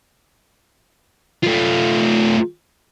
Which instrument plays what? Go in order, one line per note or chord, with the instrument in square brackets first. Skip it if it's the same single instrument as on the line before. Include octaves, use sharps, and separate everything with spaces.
[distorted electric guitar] A3 F4